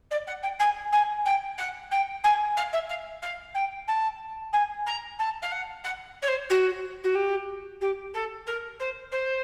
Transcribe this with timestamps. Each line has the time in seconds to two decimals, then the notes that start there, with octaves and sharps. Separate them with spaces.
0.10 D5
0.26 F#5
0.42 G5
0.59 G#5
0.92 G#5
1.25 G5
1.57 F#5
1.91 G5
2.23 G#5
2.56 F5
2.72 E5
2.89 F5
3.22 F5
3.54 G5
3.87 A5
4.52 G#5
4.86 A#5
5.18 A5
5.42 F5
5.51 F#5
5.83 F#5
6.22 C#5
6.27 C5
6.49 F#4
7.03 F#4
7.14 G4
7.80 G4
8.13 A4
8.46 A#4
8.79 C5
9.11 C5